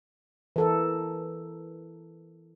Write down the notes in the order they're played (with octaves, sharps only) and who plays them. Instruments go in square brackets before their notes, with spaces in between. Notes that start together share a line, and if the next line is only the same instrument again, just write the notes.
[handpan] E3 A4 A#4